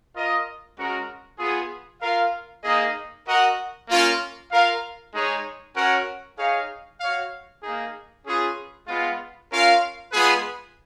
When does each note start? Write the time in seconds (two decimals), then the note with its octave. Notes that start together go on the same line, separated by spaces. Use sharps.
0.14 F4 A#4 D#5
0.77 G#3 C#4 F#4 A#4
1.39 B3 F4 G#4
2.02 F4 A#4 F5
2.63 A#3 D#4 G#4 D#5
3.26 F#4 A#4 D#5 F#5
3.88 A#3 C#4 F4 A#4
4.51 F4 A#4 F5
5.13 G#3 D#4 G#4 C#5
5.75 C#4 F#4 A#4 C#5 F#5
6.38 D#4 G#4 C#5 F5
7.00 F#4 C#5 F5
7.63 A#3 D#4 G#4
8.25 C#4 F4 G#4 B4
8.87 G#3 B3 F4
9.50 C#4 F4 A#4 F5
10.12 G#3 B3 F4 G#4 B4